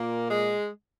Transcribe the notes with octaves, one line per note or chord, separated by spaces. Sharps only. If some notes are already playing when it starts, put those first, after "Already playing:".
Already playing: A#2 A#3
G#3